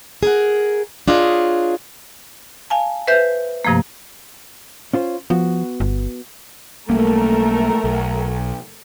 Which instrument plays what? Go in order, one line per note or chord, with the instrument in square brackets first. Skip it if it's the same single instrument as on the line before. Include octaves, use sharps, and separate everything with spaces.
[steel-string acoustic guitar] G#4 A#4 F#5
D4 F4 G#4 C#5 D#5
[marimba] F5 G#5 A5
B4 C5 E5 G6
G2 C3 F3 A3 A#3
[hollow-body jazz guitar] C#4 F4 C5
[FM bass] F3 [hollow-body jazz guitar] B3 F#4
[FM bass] G1
[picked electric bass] B1 G3 A#3 [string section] A3 A#4
[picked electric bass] B1